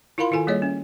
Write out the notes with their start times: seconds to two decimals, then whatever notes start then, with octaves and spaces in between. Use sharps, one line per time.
0.18 E4 F4 A#4 F5 B5 C6
0.31 D#3 E4 F4 A4 G#5
0.47 G3 A#3 G#4 C#5 D#5
0.62 C#4